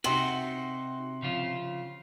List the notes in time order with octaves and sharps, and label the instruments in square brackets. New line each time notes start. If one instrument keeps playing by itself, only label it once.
[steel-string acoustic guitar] C3 [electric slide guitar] D#4 F#4 [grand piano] F#5 C6 F#7
[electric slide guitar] C#3 F3 F4